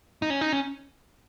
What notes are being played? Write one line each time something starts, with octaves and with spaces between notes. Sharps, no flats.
D#4
C#4
D#4
C#4